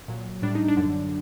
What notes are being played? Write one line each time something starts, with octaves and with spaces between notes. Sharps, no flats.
A#2 F#3
A2 G3 D4
D#4
D4
F#2 D3 F#3